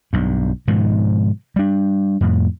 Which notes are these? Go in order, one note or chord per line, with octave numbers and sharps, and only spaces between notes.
B1 G2
G#2 B2 D#3 F3
G3 D4
F2 A2